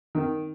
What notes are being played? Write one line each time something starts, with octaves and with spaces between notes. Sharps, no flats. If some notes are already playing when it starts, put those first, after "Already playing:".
D#3